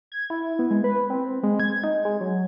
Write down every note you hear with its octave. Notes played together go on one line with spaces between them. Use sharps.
G#6
E4
B3
G#3
B4
C4
G#3
G#6
D#4
G#3
F#3